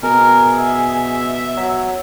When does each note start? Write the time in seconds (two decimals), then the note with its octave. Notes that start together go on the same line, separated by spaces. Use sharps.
0.03 B2 G#4 A#4
0.58 E5
1.57 F#3